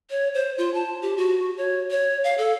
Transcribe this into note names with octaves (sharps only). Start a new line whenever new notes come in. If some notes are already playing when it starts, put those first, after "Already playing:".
C#5
C5
F4
A5
G4
F#4
C#5
C#5
F5
A4